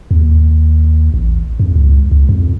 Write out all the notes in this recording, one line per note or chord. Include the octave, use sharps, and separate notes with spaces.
D#2
A1
F2
C#2
C#2
F2